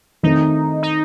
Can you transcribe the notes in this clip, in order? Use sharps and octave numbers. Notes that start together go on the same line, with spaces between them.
D#3 A3 C4 D#4
D#4